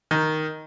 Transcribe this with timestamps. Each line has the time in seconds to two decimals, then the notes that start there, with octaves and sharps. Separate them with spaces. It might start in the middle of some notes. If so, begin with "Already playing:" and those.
0.11 D#3